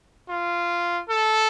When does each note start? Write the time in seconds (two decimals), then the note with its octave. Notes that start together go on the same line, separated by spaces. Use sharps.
0.29 F4
1.09 A4